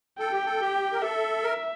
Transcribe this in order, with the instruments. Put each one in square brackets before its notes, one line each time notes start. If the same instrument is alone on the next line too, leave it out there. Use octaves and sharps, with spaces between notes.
[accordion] A4 [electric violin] G5
[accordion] G4
A4
G4
A#4
[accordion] A4 [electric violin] E5
[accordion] A#4